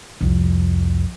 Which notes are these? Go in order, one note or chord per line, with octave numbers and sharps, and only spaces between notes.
C2 F2